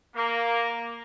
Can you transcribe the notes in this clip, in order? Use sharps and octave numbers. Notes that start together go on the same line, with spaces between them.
A#3